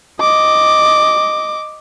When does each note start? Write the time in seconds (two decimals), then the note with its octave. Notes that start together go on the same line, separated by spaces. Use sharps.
0.20 D#5 D6